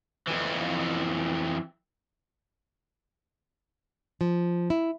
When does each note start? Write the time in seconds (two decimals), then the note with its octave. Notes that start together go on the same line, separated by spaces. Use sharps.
0.27 F2 E3
4.21 F3
4.70 E4